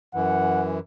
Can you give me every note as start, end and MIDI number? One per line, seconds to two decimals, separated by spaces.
0.15 0.79 42
0.15 0.79 52
0.15 0.64 78